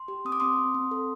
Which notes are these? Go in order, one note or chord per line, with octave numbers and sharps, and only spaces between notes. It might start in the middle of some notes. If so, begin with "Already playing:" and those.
Already playing: C6
G4
C4 D#6
D6
C4 C6 D#6
C4
C4
A4